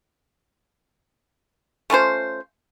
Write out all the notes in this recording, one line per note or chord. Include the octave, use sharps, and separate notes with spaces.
A3 C#4 F4 C5